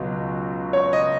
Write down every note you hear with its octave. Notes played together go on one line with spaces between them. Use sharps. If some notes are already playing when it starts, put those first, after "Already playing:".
Already playing: C#2 B2 F#3
C#5
D#5